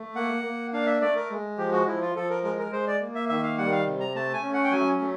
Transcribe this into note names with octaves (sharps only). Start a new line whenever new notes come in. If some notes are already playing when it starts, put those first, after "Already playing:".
Already playing: A3
A#3 F#5
A#3
D4 F5
E5
A3 D5
A#4
G#3
F3 G4
F#4
F3 E4
F4
F3 A4
A#4
G#3 A#4
A#4
G#3 C5
D5
A#3
E5
D#3 E5
F5
G3 F#5
F5
C3
A#5
A3 A5
G#5
C#4
F#5
G5
F#3 G#5
A3